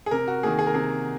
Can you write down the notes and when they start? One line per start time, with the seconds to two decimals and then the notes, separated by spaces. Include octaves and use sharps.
0.06 G#4
0.11 C3 A#4
0.28 F#4
0.43 D#3 A#3 G#4
0.59 G#4
0.66 A#4
0.74 C3 G#4